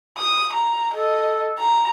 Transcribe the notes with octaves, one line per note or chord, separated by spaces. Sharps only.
D#6
A#5
A4 D#5
A#5